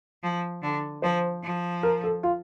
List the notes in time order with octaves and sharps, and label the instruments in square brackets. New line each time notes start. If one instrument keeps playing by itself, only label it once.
[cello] F3
D3
[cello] F3 [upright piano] C5
[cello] F3
[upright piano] A#4
A4
F4